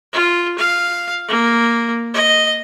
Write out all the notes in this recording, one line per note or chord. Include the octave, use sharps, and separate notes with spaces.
F4
F5
A#3
D#5